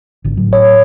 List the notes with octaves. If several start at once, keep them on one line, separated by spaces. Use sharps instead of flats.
G#1 D3
A2 F#3
C#5